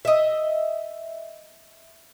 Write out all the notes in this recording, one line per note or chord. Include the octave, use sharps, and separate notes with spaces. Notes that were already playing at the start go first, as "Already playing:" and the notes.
D#5 E5